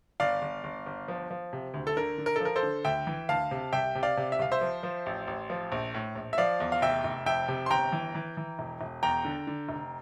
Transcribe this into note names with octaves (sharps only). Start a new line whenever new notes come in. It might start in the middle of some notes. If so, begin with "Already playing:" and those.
G1 D5 F5
G1
G1
G1
F3
F3
C3
D2
A4
D3 A#4
D3
A#4
A4
F3 A#4
A4 C5
D3
D2 E5 G5
E3
D2 F5 A5
C3
C2 E5 G5
C3
D5 F5
C3
E5
C2 F5
C5 E5
F3
F3
A1
A1
F3
A#1
A2
A#1
E5
F3 D5 F5
E2
F5
F1 E5 G5
F1
F2 E5 G5
C3
C6
G1 G5 A#5
E3
E3
E3
E1
E1
E2 G5 A#5
D3
D3
F1